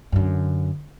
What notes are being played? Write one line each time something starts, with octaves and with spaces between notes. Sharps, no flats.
F#2 D3